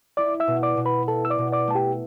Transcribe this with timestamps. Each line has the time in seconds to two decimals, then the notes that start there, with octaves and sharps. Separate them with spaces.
0.17 E4 D5 D6
0.40 E5 E6
0.47 B2
0.63 D5 D6
0.77 B2
0.85 B4 B5
1.08 E4 A4 A5
1.25 E6
1.30 D5 D6
1.38 B2
1.52 D5 D6
1.67 A3 A5
1.75 G4 G5